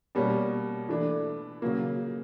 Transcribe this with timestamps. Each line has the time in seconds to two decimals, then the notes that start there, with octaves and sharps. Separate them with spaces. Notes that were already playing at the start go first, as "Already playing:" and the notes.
0.15 B2 G3 A#3 C#4
0.89 E3 A3 D4
1.62 C#3 F#3 A#3